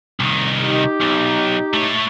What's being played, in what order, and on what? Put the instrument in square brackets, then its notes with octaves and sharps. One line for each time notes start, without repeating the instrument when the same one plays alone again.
[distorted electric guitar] C2 D#3
[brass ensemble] D#4 G4
[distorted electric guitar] B1
A3 C#5